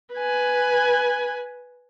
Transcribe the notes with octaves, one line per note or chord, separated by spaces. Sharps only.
B4 G#5